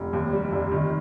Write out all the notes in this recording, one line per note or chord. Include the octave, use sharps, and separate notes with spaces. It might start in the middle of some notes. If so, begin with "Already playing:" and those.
Already playing: F1
D#2
G3
F1
D#3